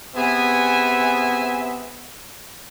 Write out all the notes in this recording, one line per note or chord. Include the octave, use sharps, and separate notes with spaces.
C3 B3 G#4 E5 G#5